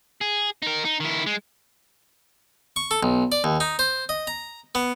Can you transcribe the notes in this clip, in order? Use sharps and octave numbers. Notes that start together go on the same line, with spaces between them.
G#4
D#4 A#4
D#4
D#3 E4
G#3
C#6
A4
B1
D5
D#2
D#4
C5
D#5
A#5
B3